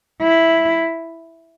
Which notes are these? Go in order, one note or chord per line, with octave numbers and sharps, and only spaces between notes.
E4